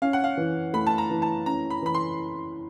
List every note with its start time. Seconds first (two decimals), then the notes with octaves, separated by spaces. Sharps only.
0.02 C#4 F5
0.13 F#5
0.24 F5
0.37 E3
0.73 A3 B5
0.87 A5
0.98 A#5
1.10 E3
1.22 A5
1.46 C#4 A#5
1.70 B5
1.82 E3 B5
1.94 C6